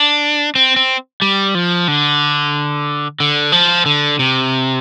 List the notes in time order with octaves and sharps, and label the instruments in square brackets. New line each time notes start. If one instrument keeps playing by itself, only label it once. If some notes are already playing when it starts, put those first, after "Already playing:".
Already playing: [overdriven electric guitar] D4
C4
C4
G3
F3
D3
D3
F3
D3
C3